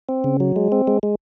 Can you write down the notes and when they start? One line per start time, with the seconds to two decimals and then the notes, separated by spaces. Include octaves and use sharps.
0.09 C4
0.24 C#3
0.40 F#3
0.56 G#3
0.72 C4
0.87 G#3
1.03 G#3